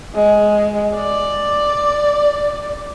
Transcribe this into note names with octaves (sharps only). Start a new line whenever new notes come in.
G#3
D5